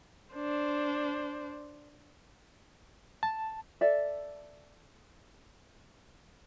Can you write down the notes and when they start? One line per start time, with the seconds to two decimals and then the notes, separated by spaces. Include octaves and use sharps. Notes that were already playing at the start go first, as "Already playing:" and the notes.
0.35 D4 C5
3.23 A5
3.81 A4 D5 E5